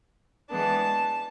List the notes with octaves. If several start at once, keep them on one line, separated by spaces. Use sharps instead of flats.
E3 G#3 B3 D4 A5